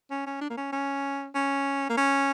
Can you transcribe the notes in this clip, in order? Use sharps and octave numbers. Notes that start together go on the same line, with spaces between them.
C#4
C#4
D4
A#3
C#4
C#4
C#4
A#3
C#4